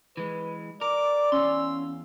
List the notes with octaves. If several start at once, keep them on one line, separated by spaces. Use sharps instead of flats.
E3 G#3 B4
A#4 D5 D6
E2 C#4 F5 C6 E6